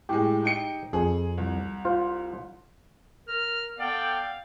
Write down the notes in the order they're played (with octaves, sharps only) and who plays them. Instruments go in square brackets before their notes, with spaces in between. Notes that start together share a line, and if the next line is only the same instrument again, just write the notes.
[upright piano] A2 G#3 [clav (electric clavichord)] G4
[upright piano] D#4 G5 C#7
[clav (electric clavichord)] F2 [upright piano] G#4
[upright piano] C2
[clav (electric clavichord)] F4 C5
[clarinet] A#4 [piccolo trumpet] F6
[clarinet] B3 [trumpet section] A4 D5 G5 [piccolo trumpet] F5